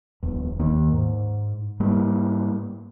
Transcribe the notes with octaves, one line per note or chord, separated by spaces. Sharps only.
D1 E2
D#2 D#3 A#3
G#2
G#2 G3 A#3